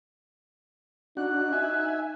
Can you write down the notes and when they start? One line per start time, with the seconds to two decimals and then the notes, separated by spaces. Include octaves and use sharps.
1.17 D4 D#4 F#4 F#6
1.53 E5 G#5